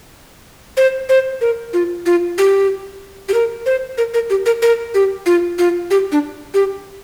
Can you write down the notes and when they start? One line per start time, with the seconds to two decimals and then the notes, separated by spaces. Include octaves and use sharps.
0.77 C5
1.09 C5
1.41 A#4
1.73 F4
2.06 F4
2.38 G4
3.29 G4
3.34 A#4
3.66 C5
3.98 A#4
4.14 A#4
4.30 G4
4.46 A#4
4.62 A#4
4.94 G4
5.26 F4
5.59 F4
5.91 G4
6.12 D4
6.54 G4